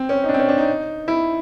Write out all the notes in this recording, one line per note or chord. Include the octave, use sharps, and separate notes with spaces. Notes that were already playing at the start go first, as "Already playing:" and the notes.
Already playing: C4
C#4
D#4
D4
C4
C#4
D4
D#4
E4